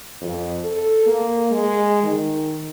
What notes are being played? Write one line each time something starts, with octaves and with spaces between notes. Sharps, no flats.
F2
A4
A#3
G#3
D#3